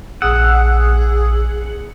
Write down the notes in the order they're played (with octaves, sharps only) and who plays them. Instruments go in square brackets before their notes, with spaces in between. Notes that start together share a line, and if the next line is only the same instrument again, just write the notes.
[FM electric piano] A#1 D#6 E6 [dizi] G#4 [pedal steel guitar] F#5